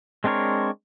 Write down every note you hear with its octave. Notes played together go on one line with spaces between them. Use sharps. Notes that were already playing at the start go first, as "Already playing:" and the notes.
G#3 C4 D4 A#4 C#5